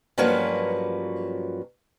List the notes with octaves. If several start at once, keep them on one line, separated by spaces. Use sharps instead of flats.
G2 F3 F#3 A#3 C#4 B4